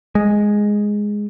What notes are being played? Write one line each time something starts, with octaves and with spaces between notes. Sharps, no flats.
G#3